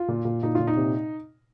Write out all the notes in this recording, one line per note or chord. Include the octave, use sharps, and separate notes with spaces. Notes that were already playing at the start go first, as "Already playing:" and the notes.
Already playing: F4
A#2
A#2
A#2 D#4
A#2 F4
D#4
C3